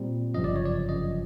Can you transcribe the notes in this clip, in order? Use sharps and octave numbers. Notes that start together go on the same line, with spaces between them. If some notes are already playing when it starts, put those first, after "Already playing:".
Already playing: A#2 G3 C4
G1 F#2 C#3 F3 D#5
D5
C#5
D5
G1 F#2 C#3 F3 D#5